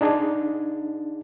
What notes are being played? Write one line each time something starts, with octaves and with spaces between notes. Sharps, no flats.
D4 D#4 G#4